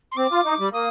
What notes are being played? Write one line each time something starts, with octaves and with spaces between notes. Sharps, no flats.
C6
C4 D6
F4
D#4
G3
A#3 D#6